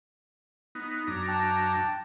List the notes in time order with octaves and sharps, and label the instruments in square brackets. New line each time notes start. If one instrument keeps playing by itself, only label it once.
[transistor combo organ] B3 D#4
F#2 D4 A#5
[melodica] G5 A5